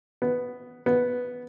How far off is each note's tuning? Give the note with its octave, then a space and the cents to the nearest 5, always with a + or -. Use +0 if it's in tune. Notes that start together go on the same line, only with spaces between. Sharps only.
B3 +5
B3 +0